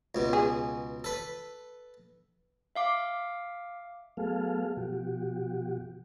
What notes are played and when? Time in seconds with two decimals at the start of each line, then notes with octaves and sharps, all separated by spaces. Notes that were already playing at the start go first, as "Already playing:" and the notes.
0.15 C#2 B2
0.33 G#4
1.04 A4 B4
2.76 E5 F5 D6
4.17 F#3 A3 B3 G#4 A4 F5
4.77 B2 F3 F#4 G4